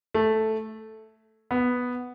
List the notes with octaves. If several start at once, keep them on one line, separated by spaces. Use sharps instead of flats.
A3
B3